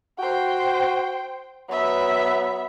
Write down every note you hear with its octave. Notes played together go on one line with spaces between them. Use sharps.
F#4 C5 G5
F#3 B3 E5